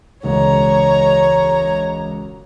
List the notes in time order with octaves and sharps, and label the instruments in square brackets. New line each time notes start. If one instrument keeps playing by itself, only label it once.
[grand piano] E1 C#2 [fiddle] C#5 A#5